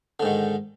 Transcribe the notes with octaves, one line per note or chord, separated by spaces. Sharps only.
G#2 D3 D#3